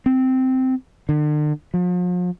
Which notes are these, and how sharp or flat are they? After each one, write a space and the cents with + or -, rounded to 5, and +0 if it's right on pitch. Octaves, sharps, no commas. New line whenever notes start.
C4 -10
D3 +40
F3 +40